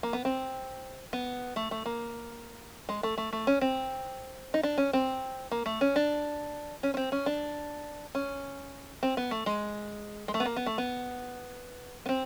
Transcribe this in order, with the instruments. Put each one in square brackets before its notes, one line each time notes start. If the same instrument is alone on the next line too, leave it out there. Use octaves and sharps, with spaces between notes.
[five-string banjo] A#3
B3
C4
B3
A3
A3
A#3
G#3
A3
A3
A3
C#4
C4
D#4
D4
C#4
C4
A#3
A3
C#4
D4
C#4
C#4
C4
C#4
D4
C#4
C4
B3
A3
G#3
G#3
A3
B3
A#3
B3
A3
B3
B3
C4